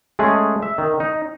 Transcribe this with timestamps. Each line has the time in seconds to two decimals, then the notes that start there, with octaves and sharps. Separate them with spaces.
0.19 G#3 A3 C#4 G#4
0.63 E5
0.78 D#3
1.00 D#4